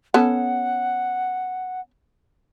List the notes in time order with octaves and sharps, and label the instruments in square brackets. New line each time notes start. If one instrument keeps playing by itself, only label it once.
[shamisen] B3 C#4 A4 [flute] F#5